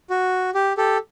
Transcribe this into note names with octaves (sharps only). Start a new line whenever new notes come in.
F#4
G4
G4 A4